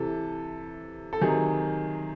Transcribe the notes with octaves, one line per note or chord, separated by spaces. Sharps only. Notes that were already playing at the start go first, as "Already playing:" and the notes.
Already playing: C3 E3 A4
A4
C3 D#3 F#3 G#4